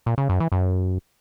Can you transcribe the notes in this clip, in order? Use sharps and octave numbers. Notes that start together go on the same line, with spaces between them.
A#2
C#3
F#2
E3
F#2